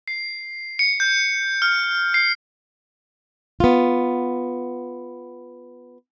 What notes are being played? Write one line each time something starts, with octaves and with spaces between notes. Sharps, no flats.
C7
C#7
G6
F6
C7
B3 F4